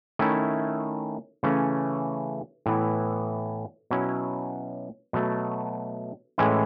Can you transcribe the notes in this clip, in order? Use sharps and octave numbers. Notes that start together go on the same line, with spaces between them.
D#3 A3 C#4 E4
C#3 E3 A3 C#4
A2 E3 B3 E4
B2 F#3 C#4 E4
B2 F#3 A3
A2 E3 G#3 C#4 E4